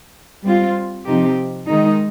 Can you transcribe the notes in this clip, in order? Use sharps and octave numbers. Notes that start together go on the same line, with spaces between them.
G3 C4 F4
C3 F3 C4 D#4 G4
D#3 G#3 D#4